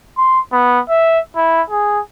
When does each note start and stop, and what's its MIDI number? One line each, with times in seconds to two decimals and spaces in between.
0.18 0.40 84
0.52 0.80 59
0.89 1.19 76
1.36 1.62 64
1.70 2.00 68